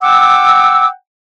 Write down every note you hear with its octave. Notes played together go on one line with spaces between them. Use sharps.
F#5 G5 D6 E6